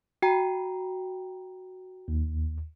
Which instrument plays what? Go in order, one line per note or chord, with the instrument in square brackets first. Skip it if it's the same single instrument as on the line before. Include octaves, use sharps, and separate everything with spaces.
[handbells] F#4 G5 A#5
[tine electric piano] D#2